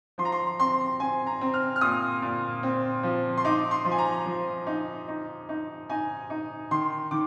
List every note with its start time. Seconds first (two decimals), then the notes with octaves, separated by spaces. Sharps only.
0.18 F3 C6
0.25 A#5
0.32 C6
0.59 C4 C6
1.00 C4 G#5
1.27 A#5
1.41 C4
1.54 F6
1.76 F6
1.81 A#2 D#6
2.22 A#2
2.63 C4
3.03 F3
3.38 C6
3.45 D#4 D6
3.71 C6
3.85 F3
3.91 G#5
3.98 A#5
4.26 F3
4.67 D#4
5.08 D#4
5.49 D#4
5.90 D#4 G#5
6.30 D#4
6.71 D#3 C6
7.11 D#3 D6